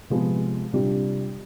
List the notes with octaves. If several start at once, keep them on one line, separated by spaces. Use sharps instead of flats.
C3 F3 G#3 B3
C3 G3 D4 F4